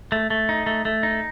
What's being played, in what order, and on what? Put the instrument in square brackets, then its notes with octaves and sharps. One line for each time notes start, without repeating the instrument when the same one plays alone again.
[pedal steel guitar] A3
A3
D#4
A3
A3
D#4